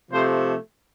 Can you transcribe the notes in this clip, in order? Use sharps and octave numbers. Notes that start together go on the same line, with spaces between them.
C3 F3 A3 C5